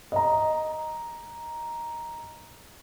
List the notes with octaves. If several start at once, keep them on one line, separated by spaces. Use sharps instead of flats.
D#5 A#5